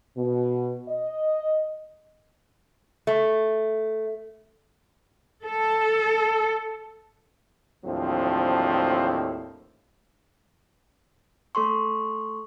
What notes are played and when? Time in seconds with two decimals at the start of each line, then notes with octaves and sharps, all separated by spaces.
0.17 B2
0.89 D#5
3.07 A3
5.45 A4
7.85 D#2 A2 F3 F#3 C4 D4
11.55 A3 A4 C6 C#6